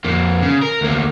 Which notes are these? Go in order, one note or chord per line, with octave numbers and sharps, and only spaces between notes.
F2 A#3
C#3
A#4
D2 A#3